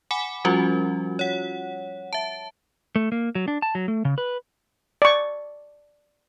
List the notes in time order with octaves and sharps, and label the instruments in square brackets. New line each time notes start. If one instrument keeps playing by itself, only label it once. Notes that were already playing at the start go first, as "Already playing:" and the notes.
[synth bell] F#5 G#5 B5 D6
F3 G3 C#4 F4 F#4
C#5 F#5
E5 A5
[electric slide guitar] A3
A#3
F#3
D4
A5
F#3
A3
C#3
B4
[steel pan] D5 C#6